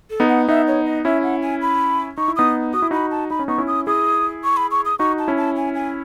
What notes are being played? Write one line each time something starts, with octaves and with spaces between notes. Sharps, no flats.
A4
B3 D#4
F#5
B3 D#4 E5
C#5
D#5
C#4 E4 E5
F#5
G#5
B5
D#4 C#6
E4
B3 D#4 D#6
F#4 D#6
E4
D#4 F#4 B5
A5
D#4 B5
C#4
B3 D#4 C#6
C#4 E4
D#6
E4 G#4 D#6
C#6
B5
C#6
D#6
D#4 F#4 C#6
A5
C#4 E4
A5
G#5
G#5